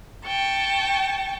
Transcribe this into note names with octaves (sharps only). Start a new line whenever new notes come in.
G5 A5 C#6